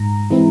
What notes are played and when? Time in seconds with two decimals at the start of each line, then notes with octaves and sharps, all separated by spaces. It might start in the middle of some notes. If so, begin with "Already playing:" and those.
Already playing: G#2 A#5
0.30 E3 G#3 C4 E4